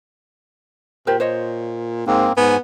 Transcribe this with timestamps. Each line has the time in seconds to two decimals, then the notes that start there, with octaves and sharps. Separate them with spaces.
1.07 A#2 G4 A#4 C5
1.20 C5 C#5 D#5
2.07 G#2 A#3 C4
2.37 G#2 B3 G#5